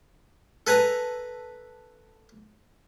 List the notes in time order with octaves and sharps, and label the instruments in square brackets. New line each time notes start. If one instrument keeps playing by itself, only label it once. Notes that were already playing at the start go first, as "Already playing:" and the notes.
[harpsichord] A4 B4 G#5 A#5